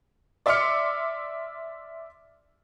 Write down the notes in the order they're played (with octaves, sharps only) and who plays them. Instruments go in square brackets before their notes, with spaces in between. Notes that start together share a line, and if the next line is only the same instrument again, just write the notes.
[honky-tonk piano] D5 E5 C6 D6 F6 C#7